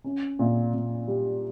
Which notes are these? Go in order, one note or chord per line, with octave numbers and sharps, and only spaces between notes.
C#4
A#2
A#2
G3